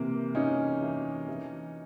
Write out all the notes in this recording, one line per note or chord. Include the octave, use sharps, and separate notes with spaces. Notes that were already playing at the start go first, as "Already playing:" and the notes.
Already playing: C3 E3 A#3
E3 C#4 D#4
E3
E3